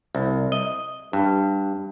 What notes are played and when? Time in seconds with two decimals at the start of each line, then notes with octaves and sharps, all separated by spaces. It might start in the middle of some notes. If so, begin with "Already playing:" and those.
0.15 C2
0.52 D#5
1.13 G2